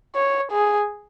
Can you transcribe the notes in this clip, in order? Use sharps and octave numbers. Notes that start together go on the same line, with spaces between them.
C#5
G#4